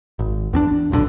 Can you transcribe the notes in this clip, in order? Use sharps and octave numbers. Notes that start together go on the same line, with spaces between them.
G#1
E2 C4 D4
D#1 B1 A2 D3